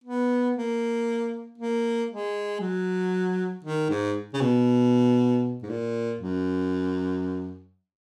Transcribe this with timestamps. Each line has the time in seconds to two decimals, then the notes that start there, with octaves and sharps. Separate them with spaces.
0.04 B3
0.56 A#3
1.58 A#3
2.10 G#3
2.61 F#3
3.65 D#3
3.90 G#2
4.34 C#3
4.41 B2
5.63 G#2
5.70 A#2
6.21 F#2